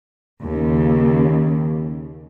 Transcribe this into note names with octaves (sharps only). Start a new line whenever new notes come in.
D#2 C#3